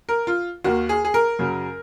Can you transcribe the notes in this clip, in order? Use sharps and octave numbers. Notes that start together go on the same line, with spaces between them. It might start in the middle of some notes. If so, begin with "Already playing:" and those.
A#4
F4
D#2 D#3 A#3 F#4
G#4
G#4
A#4
F#2 C#3 F#3